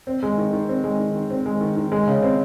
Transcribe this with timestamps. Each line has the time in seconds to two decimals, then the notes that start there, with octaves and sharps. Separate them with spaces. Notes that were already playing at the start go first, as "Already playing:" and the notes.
0.07 C4
0.23 G#3
0.38 D#3
0.53 D#3
0.69 C4
0.84 G#3
0.99 D#3
1.14 D#3
1.30 C4
1.46 G#3
1.61 D#3
1.77 D#3
1.92 G#3
2.07 C#3
2.23 C4